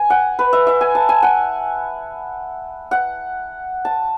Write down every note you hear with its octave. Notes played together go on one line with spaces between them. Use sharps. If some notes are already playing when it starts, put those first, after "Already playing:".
Already playing: G#5
F#5
B4
E5
E5
G#5
A5
G#5
F#5
F#5
A5